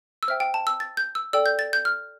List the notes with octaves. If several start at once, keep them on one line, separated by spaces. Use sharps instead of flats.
E6
C5 E5 G5 F6
G5
A5
E6
A6
G6
E6
A4 D5 G5 E6
G6
A6
G6
F6